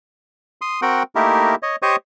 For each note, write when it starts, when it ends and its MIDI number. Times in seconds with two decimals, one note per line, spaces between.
0.61 0.81 84
0.61 0.81 87
0.82 1.03 60
0.82 1.03 66
0.82 1.03 70
0.82 1.03 78
0.82 1.03 79
1.15 1.55 57
1.15 1.55 58
1.15 1.55 63
1.15 1.55 64
1.15 1.55 67
1.15 1.55 70
1.63 1.76 73
1.63 1.76 75
1.82 1.96 67
1.82 1.96 72
1.82 1.96 73
1.82 1.96 75
1.82 1.96 85
1.82 1.96 87